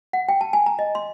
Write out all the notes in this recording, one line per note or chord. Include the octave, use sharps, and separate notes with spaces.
F#5
G5
A5
G#5
A#5
D#5
C6